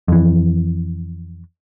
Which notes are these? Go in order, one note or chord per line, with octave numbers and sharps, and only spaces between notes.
F2 E3